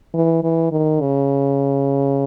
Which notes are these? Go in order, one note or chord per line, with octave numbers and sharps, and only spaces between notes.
E3
E3
D#3
C#3